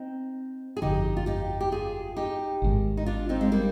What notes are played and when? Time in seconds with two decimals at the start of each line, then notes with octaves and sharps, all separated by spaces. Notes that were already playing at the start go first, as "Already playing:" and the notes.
Already playing: C4 D#4
0.77 G#4
0.82 G1 F2 D3 F3 D#4 G4
1.17 F4
1.26 D#4 G4
1.61 G4
1.72 F4 G#4
2.16 D#4 G4
2.62 G#1 G#2 D#3
2.97 D#4
3.06 D4 F4
3.29 C4 D#4
3.41 G#3
3.52 G3 A#3